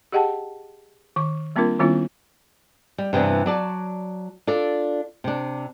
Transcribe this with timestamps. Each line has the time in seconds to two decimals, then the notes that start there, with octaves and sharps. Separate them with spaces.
0.12 G4 G#4 D#5 F#5 G5 A5
1.16 D#3 C#6
1.56 G3 A#3 C4 D4 F4 A#4
1.79 D#3 G3 B3 C#4 E4 F4
2.98 G3
3.13 G2 C3 E3 B3 D4
3.46 F#3 D5 A5
4.47 D4 F4 A4 D5
5.24 C3 D4